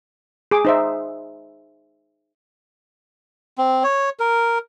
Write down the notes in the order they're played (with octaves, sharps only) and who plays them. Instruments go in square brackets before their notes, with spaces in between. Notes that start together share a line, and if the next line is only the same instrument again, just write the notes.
[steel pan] G#4 D6
D#4 C5 E5
[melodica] C4
C#5
A#4